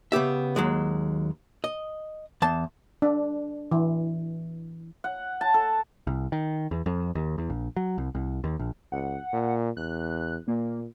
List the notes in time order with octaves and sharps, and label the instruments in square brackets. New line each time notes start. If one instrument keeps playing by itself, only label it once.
[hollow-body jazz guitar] C#3 B3 G4 E5
D#2 F#3 G#3
D#5
E2 A5
[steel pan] D4
E3
[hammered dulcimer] F#5
A5
A4
[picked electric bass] C2
D#3
E2
F2
D#2
E2
A#1
F#3
C2
C2
D#2
A#1
[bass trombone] C#2 [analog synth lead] F#5
[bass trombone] A#2
[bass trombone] E2 [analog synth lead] F#6
[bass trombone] A#2 [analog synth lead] A#3